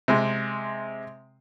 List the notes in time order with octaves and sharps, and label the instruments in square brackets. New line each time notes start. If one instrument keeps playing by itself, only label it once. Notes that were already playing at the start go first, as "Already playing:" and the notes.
[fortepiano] C3 G#3